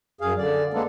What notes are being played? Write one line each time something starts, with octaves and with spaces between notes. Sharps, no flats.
F#2 G#4 F5
D3 D5
G#3 A#3 B3 D4 A4